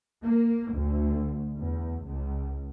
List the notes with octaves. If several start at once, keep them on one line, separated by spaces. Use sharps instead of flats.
A#3
D2
E2
C#2